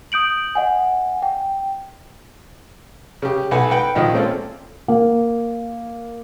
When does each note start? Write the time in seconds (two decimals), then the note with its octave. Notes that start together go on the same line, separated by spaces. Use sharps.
0.12 D#6 G6 D7 F#7
0.55 D#5 F#5 G#5
1.22 G5
3.22 C#3 G4
3.51 B1 B4 F#5 G#5
3.71 B4 F#5 G5
3.95 A#1 D#3 F3 D#5 E5
4.13 G#3 A#3 C4 C#4 F4 A4
4.88 A#3